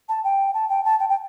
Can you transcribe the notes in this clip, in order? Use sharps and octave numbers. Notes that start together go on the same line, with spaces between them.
A5
G5
A5
G5
A5
G5
G5